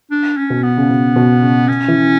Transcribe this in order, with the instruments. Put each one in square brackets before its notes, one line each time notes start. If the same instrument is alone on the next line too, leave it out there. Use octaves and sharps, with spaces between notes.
[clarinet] D4
C#4
[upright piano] B2
[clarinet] B3
[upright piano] C#3
B2
B2
C#3
[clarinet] C#4
[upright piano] E3